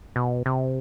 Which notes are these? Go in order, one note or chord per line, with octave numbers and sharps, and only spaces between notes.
B2
C3